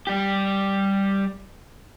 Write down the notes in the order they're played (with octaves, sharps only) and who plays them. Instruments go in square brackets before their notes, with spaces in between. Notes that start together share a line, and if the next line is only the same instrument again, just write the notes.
[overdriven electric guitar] G3 G4